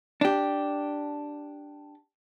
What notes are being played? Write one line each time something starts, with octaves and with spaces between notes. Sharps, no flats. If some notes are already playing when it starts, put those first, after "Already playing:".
D4 G4